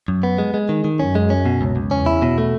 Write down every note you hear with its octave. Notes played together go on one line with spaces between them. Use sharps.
F#2
B3
G#3
G#3
D#3
D#3
F#2 C#4
G#3
C#4
B2
C#2
C#2
E2 C#4
E4
B2
A3